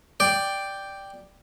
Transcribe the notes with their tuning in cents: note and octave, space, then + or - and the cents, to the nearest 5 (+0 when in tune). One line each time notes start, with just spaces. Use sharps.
D5 +0 G5 +0